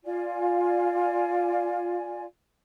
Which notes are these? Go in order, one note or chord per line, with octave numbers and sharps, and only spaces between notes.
F4 D5 G#5